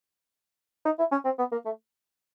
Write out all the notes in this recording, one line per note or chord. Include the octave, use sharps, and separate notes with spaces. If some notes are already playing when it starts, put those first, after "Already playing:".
D#4
E4
C#4
C4
B3
A#3
A3